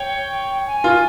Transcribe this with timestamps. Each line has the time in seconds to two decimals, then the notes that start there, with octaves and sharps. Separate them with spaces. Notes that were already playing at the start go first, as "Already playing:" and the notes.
Already playing: C#5 G5
0.67 G#5
0.84 F4